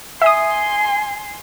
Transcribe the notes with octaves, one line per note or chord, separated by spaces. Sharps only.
E5 G#5 C6 D#6